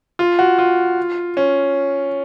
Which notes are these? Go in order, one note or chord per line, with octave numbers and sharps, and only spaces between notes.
F4
F#4
F4
C#4